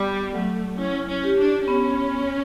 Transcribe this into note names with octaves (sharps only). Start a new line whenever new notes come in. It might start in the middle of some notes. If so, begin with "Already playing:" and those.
Already playing: G3 B3
F#3 A3
C#4 E4
C#4
G4
D4
B3 C#4